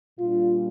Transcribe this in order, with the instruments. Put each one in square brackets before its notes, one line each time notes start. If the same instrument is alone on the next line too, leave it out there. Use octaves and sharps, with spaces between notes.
[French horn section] A#2 G3 D4 F4